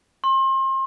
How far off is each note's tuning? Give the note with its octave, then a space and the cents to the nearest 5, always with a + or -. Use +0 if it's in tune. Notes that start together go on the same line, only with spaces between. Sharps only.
C6 +35